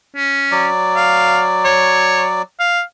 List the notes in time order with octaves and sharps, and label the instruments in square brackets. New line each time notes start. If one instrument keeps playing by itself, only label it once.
[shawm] C#4
[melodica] F#3 D5
[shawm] F5
C#5
F5